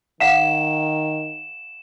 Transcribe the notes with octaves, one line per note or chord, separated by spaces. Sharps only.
D#3 F5 F#5 E7